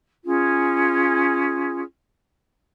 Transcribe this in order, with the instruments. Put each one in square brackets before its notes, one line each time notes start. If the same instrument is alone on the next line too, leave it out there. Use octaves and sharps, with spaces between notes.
[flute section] C#4 F4 G#4